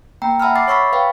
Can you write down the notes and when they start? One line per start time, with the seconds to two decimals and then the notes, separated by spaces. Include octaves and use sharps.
0.22 A#3 G5 A#5
0.40 E5 F#5 A5 B5 E6 F6
0.55 E5 D6 A6 C7
0.68 C#5 B5 C#6 E6 A6 B6
0.92 B4 F5 G5